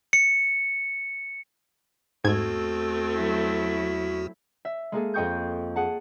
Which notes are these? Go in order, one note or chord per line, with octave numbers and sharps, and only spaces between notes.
C#7
E2 G#2 A3 C4 F#4 G#6
F#3 E4
E5
G#3 A#3 G#4 A4
F2 D#5 G5 C#6 D#6 G6
G#4 F#5 A5